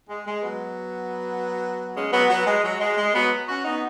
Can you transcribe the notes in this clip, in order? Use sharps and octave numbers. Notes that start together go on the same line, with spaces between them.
G#3
G#3
F#3 B3
G#3 C#4
F#3 B3
F#3 B3
G#3
F#3
G#3
G#3
F#3 B3
C#4 F#4
B3 D#4